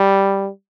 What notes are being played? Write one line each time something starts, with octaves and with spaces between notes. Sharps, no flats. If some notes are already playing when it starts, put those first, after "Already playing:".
Already playing: G3